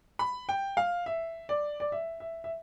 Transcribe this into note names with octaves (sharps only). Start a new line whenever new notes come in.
B5
G5
F5
E5
D5
D5
E5
E5
E5